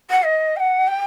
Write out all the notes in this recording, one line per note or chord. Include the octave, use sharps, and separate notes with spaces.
F#5
D#5
G5
F#5
G5